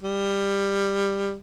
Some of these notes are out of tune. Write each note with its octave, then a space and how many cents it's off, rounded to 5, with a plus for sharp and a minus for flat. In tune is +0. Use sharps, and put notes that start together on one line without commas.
G3 +15